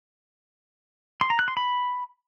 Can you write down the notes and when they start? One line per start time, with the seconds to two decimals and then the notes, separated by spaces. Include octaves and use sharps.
1.21 C6
1.30 A#5
1.39 F#6
1.48 C6
1.57 B5